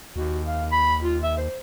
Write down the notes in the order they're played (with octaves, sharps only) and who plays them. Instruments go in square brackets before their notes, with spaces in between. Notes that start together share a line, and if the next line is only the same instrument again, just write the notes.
[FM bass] D#2 [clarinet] F#4
[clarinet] F5
B5
F4
E5
C5